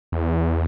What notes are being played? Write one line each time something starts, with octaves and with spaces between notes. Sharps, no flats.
E2